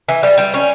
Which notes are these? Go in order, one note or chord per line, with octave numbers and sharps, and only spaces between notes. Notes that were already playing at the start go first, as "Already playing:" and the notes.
E3
G3
G3
C#4